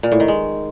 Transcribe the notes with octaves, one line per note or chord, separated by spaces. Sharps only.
A#2
A2
D#3
G#3